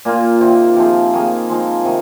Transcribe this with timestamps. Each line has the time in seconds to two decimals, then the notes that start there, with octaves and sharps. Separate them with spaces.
0.05 A#2 A#3 F4
0.41 C3 D#3 C4
0.76 C3 F3 C4 G#4
1.13 D#3 A#3 G#4
1.49 F3 G#3 C4 D#4
1.85 C3 D#3